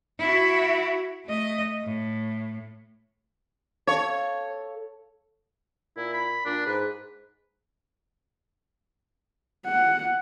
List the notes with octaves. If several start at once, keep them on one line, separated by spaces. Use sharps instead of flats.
E4 F#4
A3 D#5
A2
A4 C#5 F5
A#2 E4
B5
A#2 D4
G#2 B4
F#5